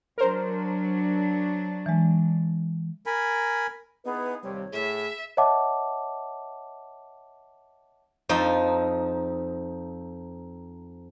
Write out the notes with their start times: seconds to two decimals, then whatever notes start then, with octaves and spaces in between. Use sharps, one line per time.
0.18 F#3 D4 A#4 C5
1.86 E3 G#3
3.06 A#4 G#5 B5
4.05 B3 D#4 E4 G#4 B4
4.44 D#2 C3 G3 C#5
4.73 A2 G#4 E5
5.37 C#5 D#5 E5 F#5 A5 D6
8.29 F2 F3 D#4